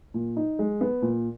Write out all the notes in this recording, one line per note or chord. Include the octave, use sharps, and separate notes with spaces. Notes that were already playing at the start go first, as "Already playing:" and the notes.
A#2
D#4
G#3
B3
A#2